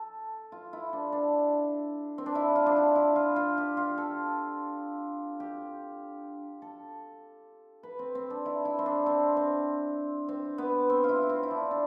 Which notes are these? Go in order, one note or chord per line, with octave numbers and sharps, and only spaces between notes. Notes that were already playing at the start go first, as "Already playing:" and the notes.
Already playing: A4
F4
E4
D4
D4
C4
D4
E4
F4
D4
E4
E4
F4
F4
G4
F4
A4
G4
A4
B4
C4
C4
D4
E4
E4
C4
D4
C4
C4
C4
B3
C4
F4
E4
C4
E4
D4
D4